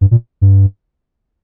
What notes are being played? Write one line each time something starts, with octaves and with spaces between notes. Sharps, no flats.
G2
A#2
G2